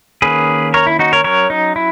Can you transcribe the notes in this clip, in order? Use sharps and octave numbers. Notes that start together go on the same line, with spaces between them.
D#3 A#3 C#4 G#4 B4
A#4 C#5
E4
D#4 F#4
A#4 C#5
F#3 C#4 A#4 C#5
D#4
E4